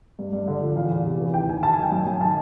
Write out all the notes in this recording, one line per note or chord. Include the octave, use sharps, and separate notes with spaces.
G2
G2
D3
F3
E2 F5
E2
C3
E3
D#2 G5
D#2 G#5
D#3 A5
G#5
F#3 G5
F#2 G5
F#2 G#5
D#3 A5